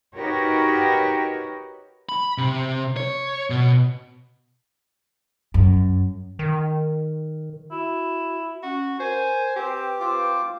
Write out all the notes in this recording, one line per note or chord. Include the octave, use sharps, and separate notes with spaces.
D#4 F#4 G4 A#4 B4 C#5
B5
C3
C#5
B2
F#2
D#3
E4 F#4
C#4 F#4
A#4 C5 G#5
C4 G4 B4
C4 F4 D6